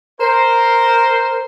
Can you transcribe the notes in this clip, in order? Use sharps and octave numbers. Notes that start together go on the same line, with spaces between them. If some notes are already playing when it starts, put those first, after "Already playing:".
A#4 C5